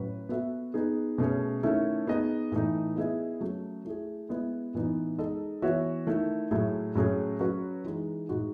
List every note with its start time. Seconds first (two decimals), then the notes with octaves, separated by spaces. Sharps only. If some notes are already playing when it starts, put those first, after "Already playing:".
Already playing: A2 F#3 C#4 F#4 B4
0.29 B3 F#4 A4 E5
0.74 B3 D#4 G#4
1.18 B2 A3 C#4 G#4 C#5
1.63 D#3 A3 C#4 E4 A4
2.07 B3 D#4 G#4 D#5
2.52 A2 E3 A3 D#4
2.96 B3 E4 G#4 D#5
3.40 F#3 A3 C#4
3.85 A3 E4 G#4
4.29 G#3 B3 E4 G#4
4.74 A2 E3 B3 D#4
5.18 G#3 D#4 A4 D#5
5.62 E3 B3 F#4 C#5 E5
6.07 D#3 A3 E4
6.51 A2 F#3 A3 E4 G#4
6.95 A2 F#3 A3 C#4 G#4
7.39 F#3 C#4 F#4 B4
7.84 E3 G#3 D#4
8.29 A2 G#3 D#4 F#4